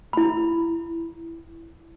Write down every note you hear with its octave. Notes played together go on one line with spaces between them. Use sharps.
E4 B5